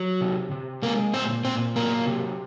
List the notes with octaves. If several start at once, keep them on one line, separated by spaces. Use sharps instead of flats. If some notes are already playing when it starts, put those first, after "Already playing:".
Already playing: F#3
C3
C3
G#3 A#3 A#4
A#2 C4 C5
A#2 C4 C5
F#3 A#3 A#4
C3